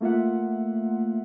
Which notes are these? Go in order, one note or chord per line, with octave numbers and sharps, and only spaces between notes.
A3 A#3 F4 E5 F#5